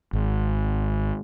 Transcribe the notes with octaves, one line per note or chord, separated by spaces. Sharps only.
G#1